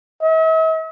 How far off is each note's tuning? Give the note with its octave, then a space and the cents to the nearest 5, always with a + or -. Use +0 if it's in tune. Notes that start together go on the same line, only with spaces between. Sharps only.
E5 -45